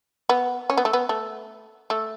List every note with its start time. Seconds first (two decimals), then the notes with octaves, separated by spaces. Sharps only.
0.29 B3
0.70 C#4
0.78 B3
0.85 A3
0.93 B3
1.09 A3
1.90 A3